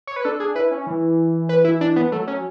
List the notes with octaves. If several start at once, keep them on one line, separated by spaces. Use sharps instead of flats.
C#5
B4
D4 A4
D4 G#4
E4 B4
C#4
E3
B4
E4
D4
B3
F#3 A3
C#4